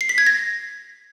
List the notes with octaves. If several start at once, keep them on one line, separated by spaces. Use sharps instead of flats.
C7
B6
G#6
A#6